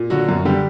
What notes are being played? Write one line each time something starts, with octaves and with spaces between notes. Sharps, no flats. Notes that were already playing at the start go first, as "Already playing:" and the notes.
Already playing: A#2
D3 F#3 F#4
F#2
D3 G3 G4